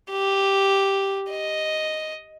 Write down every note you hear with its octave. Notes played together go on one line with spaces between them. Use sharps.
G4
D#5